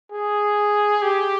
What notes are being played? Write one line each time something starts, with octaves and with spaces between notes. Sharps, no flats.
G#4
G4